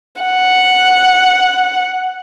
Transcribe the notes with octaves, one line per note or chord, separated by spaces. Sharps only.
F#5